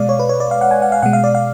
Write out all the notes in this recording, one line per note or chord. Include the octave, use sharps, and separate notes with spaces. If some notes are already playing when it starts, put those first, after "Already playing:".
Already playing: B2 G#3 D5 F5
C#5
B4
C#5
D5
F5
F#5
G#5
F#5
F5
B2 G#3 F#5
F5
D5
F5